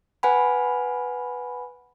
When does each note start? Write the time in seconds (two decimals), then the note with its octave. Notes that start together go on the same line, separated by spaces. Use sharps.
0.23 B4 F#5 G#5 B5